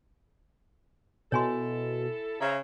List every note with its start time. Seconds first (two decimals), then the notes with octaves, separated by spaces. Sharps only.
1.32 B2 E4 A4 C#5 G#5 C6
2.41 C#3 C5 E5 A#5